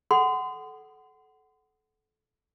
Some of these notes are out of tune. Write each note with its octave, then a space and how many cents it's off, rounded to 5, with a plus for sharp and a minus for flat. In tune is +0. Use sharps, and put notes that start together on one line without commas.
A4 -25 F#5 +15 C6 -35